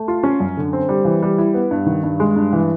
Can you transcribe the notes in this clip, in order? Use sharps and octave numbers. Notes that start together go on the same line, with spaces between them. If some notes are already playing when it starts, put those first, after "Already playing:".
Already playing: A3
F4
C#4
F#2
D3
C4
G3
E3
G3
E4
B3
G2
D#3
G2
G#3
G2
E3